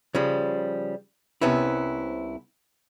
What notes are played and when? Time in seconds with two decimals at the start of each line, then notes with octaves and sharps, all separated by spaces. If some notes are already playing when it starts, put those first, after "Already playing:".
0.15 C#3 F3 G3
1.41 C2 C3 B3 C#4 E4